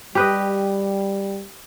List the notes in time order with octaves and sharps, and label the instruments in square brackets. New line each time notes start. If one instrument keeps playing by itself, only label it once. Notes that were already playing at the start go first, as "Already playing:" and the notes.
[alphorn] G3 [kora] G4 B4 D#5